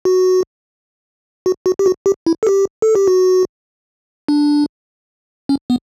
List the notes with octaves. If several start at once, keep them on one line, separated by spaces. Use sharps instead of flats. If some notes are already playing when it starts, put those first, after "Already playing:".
F#4
F#4
F#4
G4
F#4
G4
E4
A4
G4
A4
G4
F#4
D4
C#4
B3